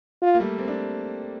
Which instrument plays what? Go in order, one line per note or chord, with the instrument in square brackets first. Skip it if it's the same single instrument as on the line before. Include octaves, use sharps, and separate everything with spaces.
[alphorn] F4
[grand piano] A#3
G3 A3
A#3 C4
D4